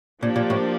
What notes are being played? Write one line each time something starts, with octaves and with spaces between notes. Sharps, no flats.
A#2 F3 A#3 D4 G4
A#2
A2